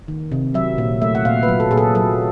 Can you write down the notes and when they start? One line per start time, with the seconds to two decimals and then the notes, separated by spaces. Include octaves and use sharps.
0.08 D#3
0.32 C3
0.54 F#3 E5
0.78 A#2
1.02 A3 E5
1.15 F#5
1.25 A#2 F5
1.43 B4
1.48 F#3
1.60 A4
1.71 A#2 G#4
1.78 A4
1.95 F#3 A4